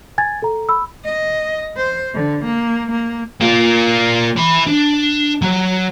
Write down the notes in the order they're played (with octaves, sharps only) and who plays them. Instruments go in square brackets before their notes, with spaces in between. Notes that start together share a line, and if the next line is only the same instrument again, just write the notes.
[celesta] G#5 G#6 A6
A4 A#5
B5 E6
[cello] D#5
C5
D3
A#3
A#3
[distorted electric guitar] A#3 F4
E3 B5
D4
F#3 F#4